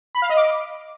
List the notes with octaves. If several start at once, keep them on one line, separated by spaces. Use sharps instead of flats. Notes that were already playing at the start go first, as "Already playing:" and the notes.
B5
F5
D#5
D6